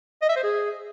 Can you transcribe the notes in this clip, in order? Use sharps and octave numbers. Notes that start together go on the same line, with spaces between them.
D#5
E5
C5
G#4